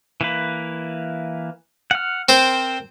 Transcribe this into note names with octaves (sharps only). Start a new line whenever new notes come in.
E3 A#3 B4
F#5 F6
C4 A#4 C5